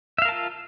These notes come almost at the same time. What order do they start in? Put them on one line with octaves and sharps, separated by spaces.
E5 F5 A#4 A5 F4